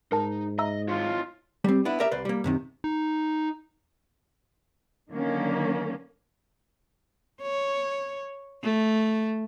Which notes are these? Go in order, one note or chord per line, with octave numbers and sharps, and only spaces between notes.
G#2 D#4 A#4 A5
D#5 E5 A#5 E6
E4 F4 C#5 D#5
G3 C4
B3 D4 E4
G4 A#4 D5 E5
C2 B4 C5 D5
G3 A#3
F#2 C3 D#3
D#4
D3 D#3 F#3 A#3 C#4
C#5
A3